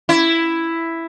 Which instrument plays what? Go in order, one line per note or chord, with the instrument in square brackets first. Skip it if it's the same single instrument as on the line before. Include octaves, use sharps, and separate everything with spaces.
[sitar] E4